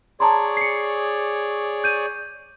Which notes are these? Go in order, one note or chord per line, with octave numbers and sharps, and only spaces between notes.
G#4 C#5 D5 A5 A#5 C6
C7 C#7
G6 D#7